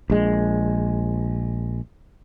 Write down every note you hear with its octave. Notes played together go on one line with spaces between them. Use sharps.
A#1 G#3